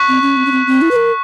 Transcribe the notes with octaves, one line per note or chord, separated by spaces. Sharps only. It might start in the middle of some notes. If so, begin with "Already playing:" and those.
Already playing: C#6 F#6 B6
C4
C#4
C4
C#4
C4
C4
E4
B4
A#4